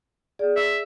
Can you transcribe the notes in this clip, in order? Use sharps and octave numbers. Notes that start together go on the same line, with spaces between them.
G#4 D5
E5